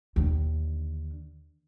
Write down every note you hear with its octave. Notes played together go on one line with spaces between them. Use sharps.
D#2 D3